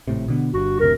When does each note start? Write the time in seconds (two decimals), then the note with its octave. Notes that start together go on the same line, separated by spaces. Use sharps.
0.07 G#1 A2 C3
0.28 B2 D3 B3
0.54 G1 G2 F#4
0.80 F#1 D2 C3 A#4